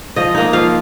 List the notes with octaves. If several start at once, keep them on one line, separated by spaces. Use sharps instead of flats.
F3 D#5
A#3 D#4
F3 F5